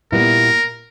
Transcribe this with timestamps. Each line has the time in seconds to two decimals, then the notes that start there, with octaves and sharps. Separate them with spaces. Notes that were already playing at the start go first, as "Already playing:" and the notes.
0.12 A#2 G3 B3 E4 A#4